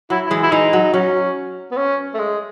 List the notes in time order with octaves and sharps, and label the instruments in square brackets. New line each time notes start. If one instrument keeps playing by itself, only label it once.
[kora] F#3 [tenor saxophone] E4
[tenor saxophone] E4
[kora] E3 G#3
[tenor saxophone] E4
[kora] E3 G#3 [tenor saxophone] D#4
[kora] F#3
[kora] F#3 [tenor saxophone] C#4
[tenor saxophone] B3
C#4
A3
G#3